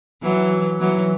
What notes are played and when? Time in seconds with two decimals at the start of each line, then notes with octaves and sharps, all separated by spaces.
0.22 E3 F#3
0.80 E3 F#3